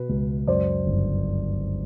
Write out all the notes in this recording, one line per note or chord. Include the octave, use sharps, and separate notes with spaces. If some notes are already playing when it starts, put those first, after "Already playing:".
Already playing: B2 B4
C#2
F#2 C5 D5
G1